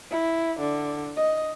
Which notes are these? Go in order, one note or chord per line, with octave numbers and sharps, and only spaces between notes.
E4
D3
D#5